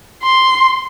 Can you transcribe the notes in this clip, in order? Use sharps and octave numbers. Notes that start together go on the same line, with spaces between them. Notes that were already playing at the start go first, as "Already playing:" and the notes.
C6